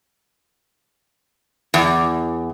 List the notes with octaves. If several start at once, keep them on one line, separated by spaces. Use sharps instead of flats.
E2